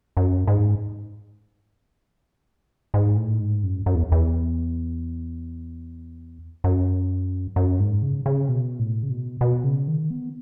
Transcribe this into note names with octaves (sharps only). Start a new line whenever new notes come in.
F#2
G#2
G#2
A2
G#2
F#2
F#2
E2
E2
F#2
F#2
G#2
C#3
C#3
B2
A2
C#3
B2
B2
C#3
D#3
B3